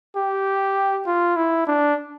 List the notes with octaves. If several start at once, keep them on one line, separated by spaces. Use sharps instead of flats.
G4
F4
E4
D4